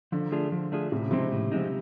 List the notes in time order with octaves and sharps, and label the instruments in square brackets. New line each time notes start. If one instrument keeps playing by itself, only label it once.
[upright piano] D3 [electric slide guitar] F3
[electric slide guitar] A3 D4 F4 G#4
F3
A3 D4 F4 G#4
[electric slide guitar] A2 [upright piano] C3
[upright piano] C#3
[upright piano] C3 [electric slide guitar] F3 G#3 C4 D#4
[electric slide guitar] A2
F3 G#3 C4 D#4